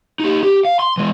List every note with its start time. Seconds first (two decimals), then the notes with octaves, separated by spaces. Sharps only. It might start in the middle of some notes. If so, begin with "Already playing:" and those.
0.20 D#4 G4
0.43 G4
0.65 F5
0.79 C6
0.97 E3 G#3